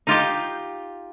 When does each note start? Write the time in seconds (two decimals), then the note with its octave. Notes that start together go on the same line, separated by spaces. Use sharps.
0.07 D#4 F4 G4 G5